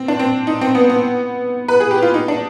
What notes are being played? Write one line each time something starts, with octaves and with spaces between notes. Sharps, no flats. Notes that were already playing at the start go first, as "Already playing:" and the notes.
Already playing: C4
D4
C4
D#4
C4
B3
B3
B4
G#4
G4
F4
D#4
D4